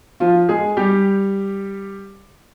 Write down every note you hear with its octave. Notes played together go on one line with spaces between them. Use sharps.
F3 F4
G#3 G#4
G3 G4